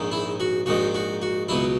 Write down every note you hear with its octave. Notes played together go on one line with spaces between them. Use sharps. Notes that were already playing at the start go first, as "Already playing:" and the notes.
Already playing: A#1 G#2 D#3
E4
F#4
A#1 G#2 D#3 F#4
F#4
F#4
C#2 B2 F#3 E4